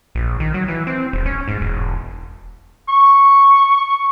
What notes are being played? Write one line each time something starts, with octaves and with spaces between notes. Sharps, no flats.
A#1
D#3
F#3
E3
C4
E1
C#4
G#2
E1
C#6